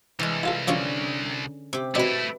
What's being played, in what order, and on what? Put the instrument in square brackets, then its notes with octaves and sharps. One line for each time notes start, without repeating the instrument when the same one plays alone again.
[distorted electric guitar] C2 [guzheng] E3 G#3
[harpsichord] E4 F4 A4
[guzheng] D3 C#4 G#4 [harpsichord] F3 C4
[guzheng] C3 G4
[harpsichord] B2 C4 D4 [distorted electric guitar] A3 E4 [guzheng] B4 E5